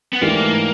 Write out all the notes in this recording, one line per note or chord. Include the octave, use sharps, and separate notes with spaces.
B3
G#2 E3 A3 A#3 D4 G4